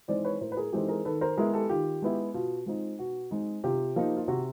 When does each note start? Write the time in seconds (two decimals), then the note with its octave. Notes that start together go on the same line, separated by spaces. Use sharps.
0.08 E3 G#3 C4 D#4 C5 D5
0.25 B4 C#5
0.41 A2 A#4 C5
0.52 B4
0.57 G#4 A#4
0.72 E3 G#3 C4 D#4 G4 A4
0.89 G#4 A#4
1.05 D#3 A4 B4
1.21 A#4 C5
1.37 G#3 B3 E4 G#4 A#4
1.54 G4 A4
1.69 D#3 F4 G4
2.02 G#3 B3 E4
2.34 B2 F4
2.66 G#3 C4 D#4 F4
2.99 B2 F#4
3.31 G#3 C4 D#4
3.64 C3 F4 G4
3.96 F3 A#3 D#4
4.17 F4
4.28 C3 F#4